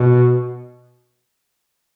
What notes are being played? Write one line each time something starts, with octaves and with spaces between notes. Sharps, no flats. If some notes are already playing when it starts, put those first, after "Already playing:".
Already playing: B2